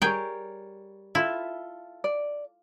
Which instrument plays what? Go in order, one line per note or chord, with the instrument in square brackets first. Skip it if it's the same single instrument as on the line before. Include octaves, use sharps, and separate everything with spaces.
[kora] G3 C#5 [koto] G#4 G5 [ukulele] A#4
[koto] E4 [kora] F4 A4 E5
[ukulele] D5